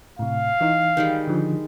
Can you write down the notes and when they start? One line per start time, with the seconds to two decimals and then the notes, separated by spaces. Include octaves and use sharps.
0.19 A2 C3 F5
0.61 E3 D#4
0.97 D#3 G3 G#3
1.27 D3 F3